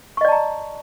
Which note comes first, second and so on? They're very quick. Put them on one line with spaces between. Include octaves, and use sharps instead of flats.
C#6 D#5 D5 A5 A#5